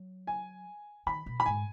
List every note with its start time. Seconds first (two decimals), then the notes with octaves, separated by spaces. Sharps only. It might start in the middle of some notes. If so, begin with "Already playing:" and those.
Already playing: F#3
0.27 G#5
1.06 D#3 B5
1.26 B2
1.40 B5
1.46 G#2 G#5